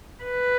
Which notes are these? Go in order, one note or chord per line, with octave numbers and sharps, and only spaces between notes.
B4